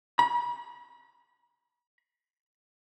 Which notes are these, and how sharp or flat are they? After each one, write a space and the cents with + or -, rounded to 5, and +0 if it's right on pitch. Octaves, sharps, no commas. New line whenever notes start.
B5 -40